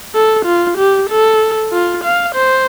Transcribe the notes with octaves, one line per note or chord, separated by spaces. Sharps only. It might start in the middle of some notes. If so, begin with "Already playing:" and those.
A4
F4
G4
A4
F4
F5
C5